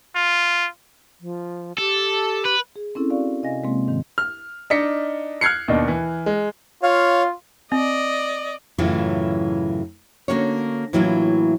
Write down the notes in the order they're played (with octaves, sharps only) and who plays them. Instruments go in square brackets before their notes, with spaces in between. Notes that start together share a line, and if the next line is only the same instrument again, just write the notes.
[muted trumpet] F4
[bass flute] F3
[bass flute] G4 [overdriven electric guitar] A4
[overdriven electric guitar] B4
[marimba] G#4
C4 C#4 E4 A4
F#4 A4 D5 F5 C#6
C3 D#5 F5 G#5 A#6
C3 G#3 A#3 C4
G#2 D#3
[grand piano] F6
D4 D#4 D#5 B6 C#7
F6 F#6 G#6 C7 C#7
D#2 B2 D4 D#4
E3
G#3
[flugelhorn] F4 [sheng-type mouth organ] C#5 F5
[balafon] C4 [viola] D5 D#5
[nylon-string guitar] F#2 A2 C#3 E3 F#3 F4
D3 A#3 C#4 F#4 C#5
A2 E3 F#3 A#3 E4 F4